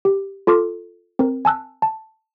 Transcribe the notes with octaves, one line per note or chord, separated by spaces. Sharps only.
G4
F4 A4 C6 D6 F6
C4 A#4
G#5 A5 E6 F#6
A5